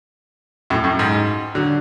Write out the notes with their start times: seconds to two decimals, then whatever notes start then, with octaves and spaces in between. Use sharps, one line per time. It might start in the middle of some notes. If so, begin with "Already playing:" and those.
0.70 F#2 A2
0.84 F#2 A2
0.99 G#2
1.55 D3 F#3